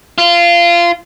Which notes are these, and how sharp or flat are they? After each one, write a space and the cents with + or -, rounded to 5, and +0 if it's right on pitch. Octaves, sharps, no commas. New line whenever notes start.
F4 -20